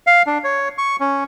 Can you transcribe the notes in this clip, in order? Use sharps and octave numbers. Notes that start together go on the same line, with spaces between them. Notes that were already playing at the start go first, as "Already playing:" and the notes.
F5
D4
C#5
C#6
C#4